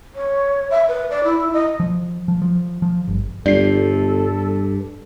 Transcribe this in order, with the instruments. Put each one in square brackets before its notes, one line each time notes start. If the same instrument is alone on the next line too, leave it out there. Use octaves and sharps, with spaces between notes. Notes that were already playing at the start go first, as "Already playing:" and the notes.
[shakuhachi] C#5
E5
B4
D5
E4
D#5
[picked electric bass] F3
F3
F3
F3
G1
[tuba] G1 [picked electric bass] G2 [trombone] A4 [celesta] D5 C7